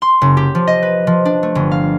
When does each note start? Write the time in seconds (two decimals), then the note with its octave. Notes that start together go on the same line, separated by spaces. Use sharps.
0.02 C6
0.22 F#1
0.37 G4
0.55 F3
0.67 D#5
0.83 B4
1.07 F3
1.25 D4
1.43 A3
1.55 G1
1.71 F5